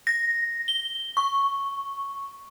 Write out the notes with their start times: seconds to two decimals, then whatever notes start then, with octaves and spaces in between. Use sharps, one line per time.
0.07 A#6
0.68 G7
1.17 C#6